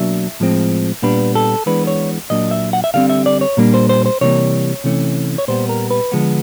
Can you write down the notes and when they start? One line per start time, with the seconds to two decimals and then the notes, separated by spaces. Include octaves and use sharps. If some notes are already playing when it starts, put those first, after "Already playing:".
Already playing: B2 F#3 A#3 D4 E5
0.40 A2 F3 G#3 C4
1.02 A#2 G3 B3 D4 B4
1.35 A4
1.66 E3 G#3 B3 D4 B4
1.87 C#5
2.30 A#2 F#3 A#3 D4 D#5
2.51 E5
2.73 F#5
2.84 E5
2.94 D3 G3 C4 F5
3.10 E5
3.26 D5
3.41 C#5
3.57 A#2 G3 A#3 D4
3.74 C5
3.89 C5
4.06 C5
4.21 C3 E3 G3 A#3 C#5
4.84 C3 E3 A3 C#4
5.38 C#5
5.48 A#2 G3 B3 C5
5.69 A#4
5.91 B4
6.12 D3 F3 G#3 B3